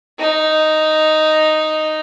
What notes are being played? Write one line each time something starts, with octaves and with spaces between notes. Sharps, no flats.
D#4